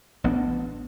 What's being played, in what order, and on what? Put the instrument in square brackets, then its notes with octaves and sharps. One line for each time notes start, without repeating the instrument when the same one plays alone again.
[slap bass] A1 B3 D4